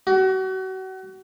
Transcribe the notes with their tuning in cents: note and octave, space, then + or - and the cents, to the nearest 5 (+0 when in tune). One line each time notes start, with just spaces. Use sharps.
F#4 +35